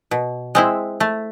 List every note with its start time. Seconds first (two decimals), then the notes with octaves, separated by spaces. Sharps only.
0.11 B2
0.55 G#3 C4 E4
1.00 A3